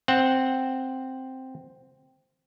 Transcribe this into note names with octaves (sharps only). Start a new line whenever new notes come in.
C4 F#5